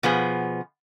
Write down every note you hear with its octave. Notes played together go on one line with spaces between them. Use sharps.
B2 F3 B3 G#4